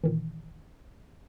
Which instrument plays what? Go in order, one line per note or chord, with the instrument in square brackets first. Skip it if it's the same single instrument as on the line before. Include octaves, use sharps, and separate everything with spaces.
[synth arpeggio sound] A#2 D#3 E3